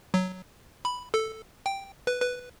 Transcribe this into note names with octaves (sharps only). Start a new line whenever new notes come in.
F#3
B5
A4
G5
B4
B4